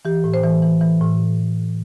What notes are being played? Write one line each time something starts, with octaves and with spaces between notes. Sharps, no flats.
E3 G4
A2
C5
E3
E3
E3
A2